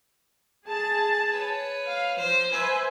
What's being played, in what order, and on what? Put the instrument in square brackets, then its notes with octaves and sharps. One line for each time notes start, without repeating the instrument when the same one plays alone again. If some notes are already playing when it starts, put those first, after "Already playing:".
[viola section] G#4 A5
[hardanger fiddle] B4 C#5
[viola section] F5
[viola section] F3 [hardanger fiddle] C5
[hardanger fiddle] B4 [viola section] C5 E5 G#5